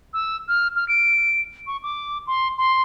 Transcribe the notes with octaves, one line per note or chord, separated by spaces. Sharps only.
E6
F6
F6
D7
C#6
D6
C6
C6